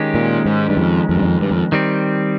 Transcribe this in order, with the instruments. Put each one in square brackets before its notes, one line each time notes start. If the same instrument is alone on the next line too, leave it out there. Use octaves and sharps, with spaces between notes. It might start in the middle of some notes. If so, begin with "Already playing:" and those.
Already playing: [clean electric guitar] D#3 G#3 C#4 G4
[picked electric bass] A#2
G#2
G2
F2
F2
G2
F2
G2
F2
[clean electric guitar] D#3 G3 C4